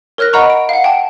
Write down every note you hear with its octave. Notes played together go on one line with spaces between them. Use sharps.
A#4 C#5 F6 F#6 A#6
D#5 F#5 A#5 B5 C#6
D7
F5 F#5
G5 A5